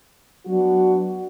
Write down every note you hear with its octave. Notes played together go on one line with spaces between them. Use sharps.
F#3 B3 D4 F#4